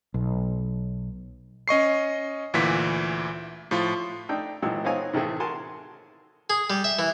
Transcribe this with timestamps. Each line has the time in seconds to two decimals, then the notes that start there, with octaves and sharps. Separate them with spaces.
0.14 B1
1.68 C#4 D#5 C#6 C7
2.54 D2 A#2 E3 B6
3.71 A2 F3 F4
4.29 A3 D4 D#4 A4 G5
4.62 G#1 A#2 E3 F#3 G#3 E6
4.84 B3 C4 D#4 C#5 F5 G#5
5.13 A2 C3 D#3 E3 A3 G#4
5.40 F#4 A#4 F#5 G#5 A5 C6
6.50 G#4
6.70 G3
6.84 E5
6.99 E3